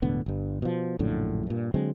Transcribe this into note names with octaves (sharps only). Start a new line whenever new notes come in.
E1 A2 D3 B3
G1 G2
B2 F3
A#1 F#2 A2 D3
G2 A#2
D3 F#3 G#3 C4